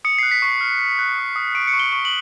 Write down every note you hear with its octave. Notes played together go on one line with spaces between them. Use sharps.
D#6 C#7
F#6 C7
B6
C#6 C7
F6
F#6
F#6
D#6
D#6
C#6 D7
C#7
C#6
G7
C#6 G7
F#7